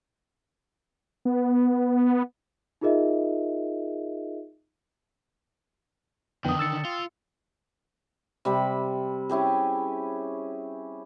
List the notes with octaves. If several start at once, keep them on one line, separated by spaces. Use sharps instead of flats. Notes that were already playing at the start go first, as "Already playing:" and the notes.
B3
D#4 F4 G#4 A#4 D#5 E5
F2 D3 D#3 B3 D#4 G5 D#6
E6 A6 C#7
F4
C3 G3 B5
C#4 E4 G4 G#4